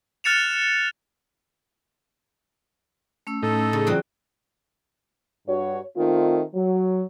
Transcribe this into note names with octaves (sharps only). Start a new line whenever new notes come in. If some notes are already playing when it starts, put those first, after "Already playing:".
F6 F#6 A6 C#7 E7 F7
A3 C#4 E6
A2 D#4 A4
C#3
E3 F#3 C4 F4 D5 G5
G2 F#4 C#5
D#3 A3 C4 D#4 F4
F#3